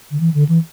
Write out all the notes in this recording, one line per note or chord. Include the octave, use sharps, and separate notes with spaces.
D3
E3
D3
E3